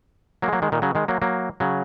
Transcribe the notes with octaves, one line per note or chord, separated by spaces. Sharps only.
F#3 A#3
G#3
F#3 A#3
D#3 G#3
A#2 D#3
C#3 F#3
D#3 G#3
F#3 A#3
F#3 A#3
C#3 F#3